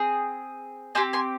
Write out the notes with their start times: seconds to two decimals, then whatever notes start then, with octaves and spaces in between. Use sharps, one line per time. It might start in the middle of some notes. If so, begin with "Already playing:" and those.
Already playing: C4 G#4
0.95 C4 G4 G#5 C6
1.13 G#5 C6